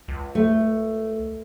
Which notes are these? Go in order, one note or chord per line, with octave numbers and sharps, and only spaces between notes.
C#2
A3